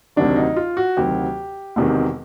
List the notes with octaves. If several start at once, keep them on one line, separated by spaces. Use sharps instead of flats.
D2 C3 D#3 F#3 D4
D#4
F4
F#4
D2 C3 D#3 F#3 G4
E1 E2 C3 D#3